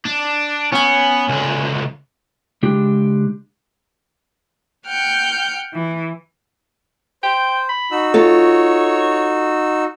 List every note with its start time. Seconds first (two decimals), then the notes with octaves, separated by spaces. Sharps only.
0.05 D4
0.72 B3 C#4 G#5
1.28 C#2 D3
2.63 C#3 G#3 D4 G4
4.87 F#5 G5 F6 G6
5.74 E3
7.23 C5 G5
7.69 B5
7.91 D#4 F#4 E6
8.14 F4 A4 C#5